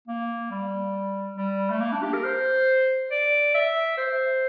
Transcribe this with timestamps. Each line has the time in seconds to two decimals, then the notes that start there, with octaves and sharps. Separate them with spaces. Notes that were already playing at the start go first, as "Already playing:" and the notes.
0.08 A#3
0.51 G3
1.37 G3
1.71 A3
1.81 A#3
1.92 D4
2.03 G4
2.13 A#4
2.24 C5
3.11 D5
3.54 E5
3.98 C5